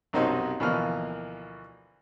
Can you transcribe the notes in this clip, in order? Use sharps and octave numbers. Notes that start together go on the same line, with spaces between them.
B1 F#2 C3 D#4 F#4 C5
D2 B2 E3 F3 A#3 F6